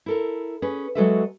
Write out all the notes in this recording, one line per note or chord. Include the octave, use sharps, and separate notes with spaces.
E4 A4 A#4
C#4 G#4 B4
F#3 G#3 F#4 A4 B4 E5